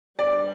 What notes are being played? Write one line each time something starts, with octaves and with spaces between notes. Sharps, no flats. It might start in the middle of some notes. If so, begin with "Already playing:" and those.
G3 B3 D4 D5